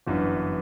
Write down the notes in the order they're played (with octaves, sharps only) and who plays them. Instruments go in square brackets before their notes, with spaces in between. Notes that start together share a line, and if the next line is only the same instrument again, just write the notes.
[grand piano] G1 F#2 E3 [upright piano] D4